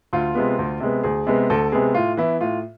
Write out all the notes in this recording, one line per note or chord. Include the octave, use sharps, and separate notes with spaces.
D2 F4
C3 G#3 B3
D2
C3 G#3 B3
D2 G#4
C3 G#3 B3
D2 A4
C3 G#3 B3 G#4
A2 F4
E3 B3 E4
A2 F4